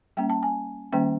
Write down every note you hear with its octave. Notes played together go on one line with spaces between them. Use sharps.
G3 A#3 C#4 G5
A5
G#5
D#3 G3 A#3 C#4 G5